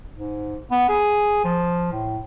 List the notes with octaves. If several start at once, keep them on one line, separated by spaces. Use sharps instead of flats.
G#2
B3
G#4
F3
A2